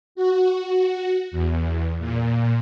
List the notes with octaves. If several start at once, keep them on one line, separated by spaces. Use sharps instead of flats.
F#4
F#4
E2
A#2